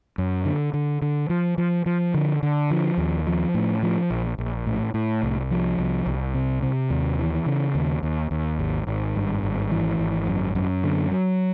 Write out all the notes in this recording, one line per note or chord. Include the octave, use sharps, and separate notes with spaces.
F#2
D3
D3
D3
F3
F3
F3
D3
D3
F3
D#2
F3
A2
F3
A#1
A#1
A2
A2
C2
F3
C2
C2
C3
C3
D#2
E3
C#3
D#2
D#2
D#2
G#1
G#1
G2
G#1
E3
G#1
F#2
F#2
D3
F#3